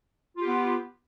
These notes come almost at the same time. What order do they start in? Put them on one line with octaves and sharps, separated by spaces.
F4 G4 B3